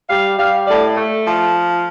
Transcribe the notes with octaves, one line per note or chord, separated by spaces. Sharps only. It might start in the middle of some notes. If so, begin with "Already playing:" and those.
G3 F5
G3 F5
A2 D5
A3
F3